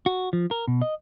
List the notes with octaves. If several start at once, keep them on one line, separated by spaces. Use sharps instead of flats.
F#4
F3
A#4
B2
D#5